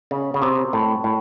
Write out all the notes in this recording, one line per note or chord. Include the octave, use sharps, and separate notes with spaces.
C#3
C#3
C3
A2
A2